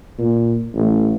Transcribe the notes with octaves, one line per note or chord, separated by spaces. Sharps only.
A#2
A1